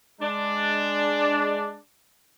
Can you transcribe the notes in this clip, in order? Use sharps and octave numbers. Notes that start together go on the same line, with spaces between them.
G#3 D4